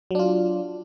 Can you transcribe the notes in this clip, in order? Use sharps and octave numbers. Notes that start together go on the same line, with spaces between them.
F#3 D4 F4